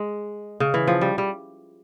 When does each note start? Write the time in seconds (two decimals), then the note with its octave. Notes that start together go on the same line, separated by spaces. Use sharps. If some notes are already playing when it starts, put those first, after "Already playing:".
Already playing: G#3
0.60 C#3
0.74 E3
0.87 F3
1.01 G3
1.18 G3